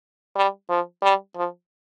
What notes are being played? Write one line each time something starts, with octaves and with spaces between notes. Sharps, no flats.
G3
F3
G3
F3